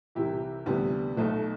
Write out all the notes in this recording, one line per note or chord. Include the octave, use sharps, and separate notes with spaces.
C2 C3 E3 E4 G4
D2 C3 E3 G3 B3
B1 B2 A3